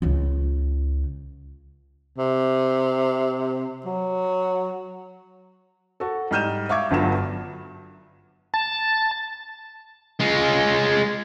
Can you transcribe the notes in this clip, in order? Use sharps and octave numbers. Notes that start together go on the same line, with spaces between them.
C#2 C#3
C3
F#3
F#4 A4
G#2 G3 F6 G6 D#7 E7
E5 F5 C#6 D6 G#6
G1 G2 F#3 F4 E7
A5
G#3 F4